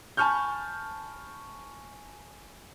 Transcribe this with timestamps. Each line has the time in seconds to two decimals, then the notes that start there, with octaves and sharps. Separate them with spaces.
0.17 G#5 A5 B5 C#6 F6 G6